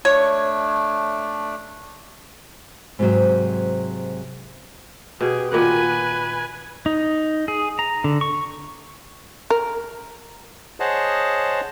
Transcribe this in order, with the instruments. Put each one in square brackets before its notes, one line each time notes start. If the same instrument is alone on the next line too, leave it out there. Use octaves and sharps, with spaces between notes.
[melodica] A3 D4 [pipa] C#5
[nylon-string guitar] G#2 C3 F#3
[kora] B2 [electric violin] G4 G#4
[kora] A#2 D#3 F#5 [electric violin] B4 G#5
[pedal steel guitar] D#4
G#4
A#5
D3
C#6
[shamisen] A#4
[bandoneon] G#4 C5 C#5 D#5 F#5 A5